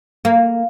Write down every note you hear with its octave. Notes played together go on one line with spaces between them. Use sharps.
A#3